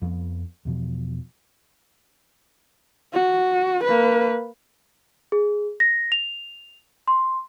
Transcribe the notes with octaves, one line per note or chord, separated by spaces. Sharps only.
F2 F3 A3 B3
E2 B2 F3
F#4
A#3 B4
G#4
A#6
F7
C6